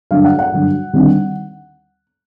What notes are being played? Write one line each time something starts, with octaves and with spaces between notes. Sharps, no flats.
G2 D3 F#3 F5
F#5
F#5
G2 D3 F#3
D#2 D3 G3 C4 D#4